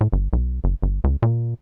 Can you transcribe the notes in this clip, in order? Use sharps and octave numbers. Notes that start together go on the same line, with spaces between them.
A2
G1
B1
F#1
G1
C#2
A#2